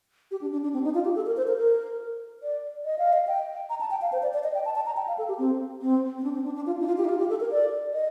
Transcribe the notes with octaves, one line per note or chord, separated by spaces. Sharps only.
G4
D4
D4
D4
C4
D#4
F4
G4
A4
A#4
C5
A#4
A#4
D5
D#5
F5
D#5
G5
A#5
A5
G5
F5
C5
D5
D5
D#5
G5
A5
A5
A#5
G5
F5
A4
G4
C4
C4
C4
D4
C4
D4
D4
F4
D#4
F4
G4
D#4
F4
G4
A4
A#4
D5
D#5